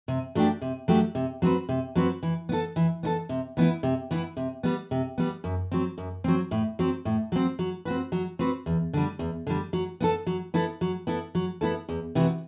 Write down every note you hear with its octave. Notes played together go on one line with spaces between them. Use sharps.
C3
F#3 A3 D4 G4
C3
F#3 A3 D4 G4
C3
F#3 C4 F#4 B4
C3
F#3 C4 F#4 B4
E3
B3 E4 A4
E3
B3 E4 A4
C3
E3 B3 E4
C3
E3 B3 E4
C3
G3 B3
C3
G3 B3
F#2
F#3 C4
F#2
F#3 C4
A2
F#3 C4
A2
F#3 C4
F#3
C4 F#4 B4
F#3
C4 F#4 B4
E2
D3 G3
E2
D3 G3
F#3
B3 E4 A4
F#3
B3 E4 A4
F#3
B3 E4 A4
F#3
B3 E4 A4
E2
C3 E3 B3 F#4